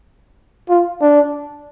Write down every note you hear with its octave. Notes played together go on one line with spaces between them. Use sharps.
F4
D4